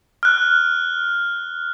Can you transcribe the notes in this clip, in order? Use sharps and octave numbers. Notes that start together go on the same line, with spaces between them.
F6 F#6